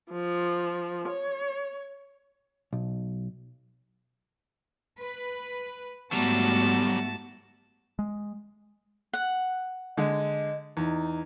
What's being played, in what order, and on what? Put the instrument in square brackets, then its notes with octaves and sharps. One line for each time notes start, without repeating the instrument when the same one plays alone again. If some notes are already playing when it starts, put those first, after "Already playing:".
[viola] F3
C#5
[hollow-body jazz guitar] B1
[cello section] B4
[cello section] G#2 A3 F#4 [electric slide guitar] F#3 G3 [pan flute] B3 [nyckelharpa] A5
[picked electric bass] G#3
[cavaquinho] F#5
[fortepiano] D3 G#3 [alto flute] D#5
[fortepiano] E2 [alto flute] D#4